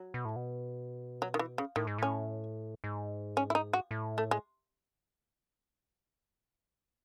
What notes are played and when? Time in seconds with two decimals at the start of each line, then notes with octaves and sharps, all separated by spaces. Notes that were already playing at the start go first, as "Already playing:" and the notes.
Already playing: F#3
0.14 B2
0.25 A2
0.36 B2
1.22 F#3
1.34 D#3
1.39 E3
1.58 C#3
1.76 A2 D#3
1.87 G#2
1.98 A2 C#4
2.84 G#2
3.37 C#4
3.50 E4
3.55 D#4
3.73 F#4
3.91 A2
4.18 A3
4.31 G#3